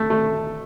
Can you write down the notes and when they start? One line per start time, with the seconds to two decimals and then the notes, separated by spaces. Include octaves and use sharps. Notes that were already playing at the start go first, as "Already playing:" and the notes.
Already playing: A3
0.10 A3